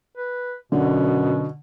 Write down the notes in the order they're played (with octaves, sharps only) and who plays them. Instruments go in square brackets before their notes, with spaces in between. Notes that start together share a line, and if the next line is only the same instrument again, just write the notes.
[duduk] B4
[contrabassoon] F#2 [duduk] B2 [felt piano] D3